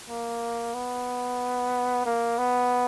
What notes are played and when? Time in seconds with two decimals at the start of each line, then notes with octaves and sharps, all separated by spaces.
0.10 A#3
0.74 B3
2.05 A#3
2.38 B3